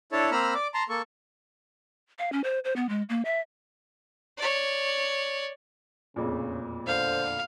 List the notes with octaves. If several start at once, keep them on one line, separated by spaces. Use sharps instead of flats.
D4 E4 A4 C#5 A5
A#3 C4 A#5 B5 E6 F6
D5 D6
A5 A#5 C6
A#3 A4 C#6
F5
C#4
C5
C5
B3
G#3
A#3
E5
C#5 D5
E1 F2 A#2 C#3
D3 C5 F5